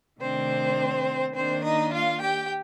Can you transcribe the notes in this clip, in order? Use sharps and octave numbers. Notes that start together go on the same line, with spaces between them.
C3 D#3 A3 C4 D4 C5
D#3 A#3 C4 D4 C5
D#4 D#5
F4 F5
G4 G5